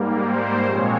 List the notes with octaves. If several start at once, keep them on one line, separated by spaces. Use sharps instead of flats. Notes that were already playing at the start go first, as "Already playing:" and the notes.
Already playing: G#2 G3 A#3
C5
A#2 F3 G#3 C4 C#5